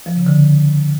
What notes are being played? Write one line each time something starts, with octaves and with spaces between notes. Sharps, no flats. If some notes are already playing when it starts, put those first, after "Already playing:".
F3
C#3
D3